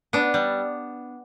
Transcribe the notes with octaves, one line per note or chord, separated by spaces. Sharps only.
B3 D4
G3